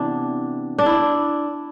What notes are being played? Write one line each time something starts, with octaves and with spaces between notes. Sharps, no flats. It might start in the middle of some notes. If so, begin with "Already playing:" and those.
Already playing: C3 E3 B3 D4
D4
E4